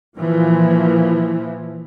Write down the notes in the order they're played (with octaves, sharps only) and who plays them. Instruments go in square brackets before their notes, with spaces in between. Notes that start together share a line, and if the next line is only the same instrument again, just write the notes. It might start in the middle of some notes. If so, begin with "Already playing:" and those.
[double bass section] A#2 E3 F3